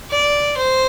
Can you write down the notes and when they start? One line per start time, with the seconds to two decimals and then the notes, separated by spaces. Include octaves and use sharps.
0.10 D5
0.57 C5